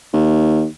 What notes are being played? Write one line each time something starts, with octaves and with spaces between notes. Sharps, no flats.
D#2